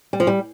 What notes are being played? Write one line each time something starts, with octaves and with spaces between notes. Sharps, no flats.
G3
F3
G3